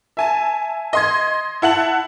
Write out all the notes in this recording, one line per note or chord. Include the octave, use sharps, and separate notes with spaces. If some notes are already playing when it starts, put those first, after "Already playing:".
E5 G#5 A5
D#5 C6 G#6
E4 F#5 A5 F#7